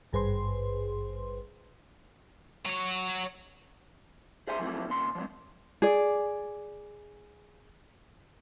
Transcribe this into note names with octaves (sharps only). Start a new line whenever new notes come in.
G#1 G2 G#4 B4 C5 C6
F#3 C#5
G#4 C5 E5 G#5 C6
F3 F#3 A3 C4 E4
D#2 A#2 C#3 C6
F3 F#3 G#3 C4
G#4 D5